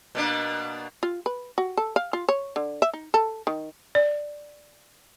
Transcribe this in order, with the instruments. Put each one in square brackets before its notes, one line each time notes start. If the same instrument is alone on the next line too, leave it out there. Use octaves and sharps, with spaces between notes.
[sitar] B2 A#3 D4
[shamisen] F4
B4
F#4
A4
F5
F4
C#5
D3
E5
D#4
A4
D#3
[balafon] D5